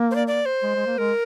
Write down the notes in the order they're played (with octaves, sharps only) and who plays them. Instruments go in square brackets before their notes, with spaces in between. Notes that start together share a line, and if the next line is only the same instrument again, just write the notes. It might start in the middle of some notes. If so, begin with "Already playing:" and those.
Already playing: [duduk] A#3
[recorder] C5
D5
D5
C5
[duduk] G#3
G#3
A#3
[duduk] G#3 [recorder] A#4